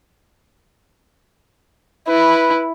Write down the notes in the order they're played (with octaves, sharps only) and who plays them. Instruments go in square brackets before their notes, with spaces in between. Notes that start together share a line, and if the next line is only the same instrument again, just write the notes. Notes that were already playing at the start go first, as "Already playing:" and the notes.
[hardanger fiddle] E4 [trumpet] B4